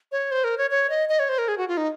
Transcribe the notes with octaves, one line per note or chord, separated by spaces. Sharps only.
C#5
C5
A#4
C#5
C#5
D#5
D#5
C#5
C5
A#4
G#4
F#4
F4
D#4